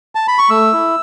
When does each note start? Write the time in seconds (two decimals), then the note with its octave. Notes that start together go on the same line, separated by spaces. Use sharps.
0.15 A5
0.28 B5
0.38 C#6
0.50 A3 E6
0.73 E4